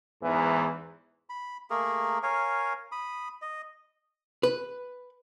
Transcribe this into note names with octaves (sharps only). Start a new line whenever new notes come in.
E2 G#2 E3
B5
A3 A#3 G#4 A#4
A#4 C#5 F5 G#5
B5 D#6
D#5
B4